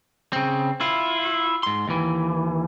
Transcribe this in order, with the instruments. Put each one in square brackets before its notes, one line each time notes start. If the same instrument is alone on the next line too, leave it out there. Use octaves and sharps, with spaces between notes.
[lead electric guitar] C#3 C4
E4 F4
G#2 C6
D#2 E3